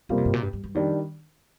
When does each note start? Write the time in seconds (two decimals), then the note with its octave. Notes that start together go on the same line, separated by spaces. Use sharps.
0.09 G2 C3 G3 A#3 F4
0.18 F2
0.25 G2
0.33 A#2
0.43 G2
0.53 G2
0.64 G2
0.75 F2 D#3 G3 D4